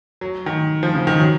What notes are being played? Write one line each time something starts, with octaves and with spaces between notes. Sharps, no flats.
F#3
D#3
F3
C#3
D#3
F#3